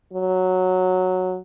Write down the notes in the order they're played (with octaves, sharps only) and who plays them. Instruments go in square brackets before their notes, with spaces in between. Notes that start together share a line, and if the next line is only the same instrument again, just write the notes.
[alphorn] F#3